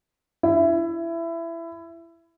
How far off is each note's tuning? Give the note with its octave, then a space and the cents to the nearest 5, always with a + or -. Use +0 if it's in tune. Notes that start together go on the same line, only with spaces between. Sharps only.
E4 +20